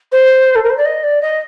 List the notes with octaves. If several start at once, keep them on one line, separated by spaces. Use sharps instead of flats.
C5
A4
A#4
C5
D5
D#5
D5
D#5